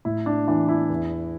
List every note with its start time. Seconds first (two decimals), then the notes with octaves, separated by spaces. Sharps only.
0.05 A2 E4
0.26 D4
0.47 E3 D4
0.69 E4
0.90 E2